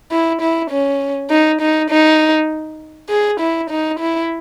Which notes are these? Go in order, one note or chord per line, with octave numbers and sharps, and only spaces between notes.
E4
E4
C#4
D#4
D#4
D#4
G#4
E4
D#4
E4